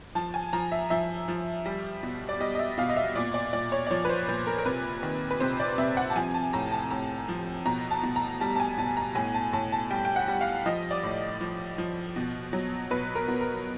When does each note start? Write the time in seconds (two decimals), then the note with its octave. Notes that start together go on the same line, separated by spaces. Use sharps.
0.15 F3 A5
0.34 G#5
0.53 F3 A#5
0.72 E5
0.90 F3 E5
1.28 F3
1.66 G3
2.03 B2
2.29 D5
2.40 G3 D#5
2.55 D#5
2.59 E5
2.78 B2 F5
2.89 D#5
2.97 E5
3.15 A#2 D5
3.34 D5
3.53 A#2 D5
3.72 C#5
3.87 D5
3.90 F3 C#5
4.05 B4
4.09 C5
4.28 A#2 B4
4.47 A#4
4.58 A#4
4.66 C3 B4
5.03 D#3
5.31 B4
5.40 C3 C5
5.60 D5
5.78 C3 E5
5.97 F#5
6.10 A5
6.16 F3 G#5
6.34 A5
6.53 A2 A#5
6.72 A5
6.91 A2 A#5
7.28 F3
7.66 B2 A#5
7.91 A5
8.03 B2
8.16 A#5
8.40 G3 A5
8.55 A5
8.60 G#5
8.78 B2 A5
8.97 A#5
9.15 A2 G#5
9.34 A5
9.53 A2 A5
9.72 A5
9.90 G3 G5
10.05 G5
10.16 F#5
10.28 G3
10.41 F5
10.66 F3 D#5
10.91 D5
11.03 A2
11.40 F3
11.78 F3
12.16 B2
12.53 F#3
12.90 B2 B4
13.15 A#4
13.28 B2
13.41 A#4